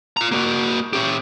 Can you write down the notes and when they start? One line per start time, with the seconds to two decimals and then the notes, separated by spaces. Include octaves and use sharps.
0.17 F4 A#5
0.32 A#3 F#4
0.93 C#4 G4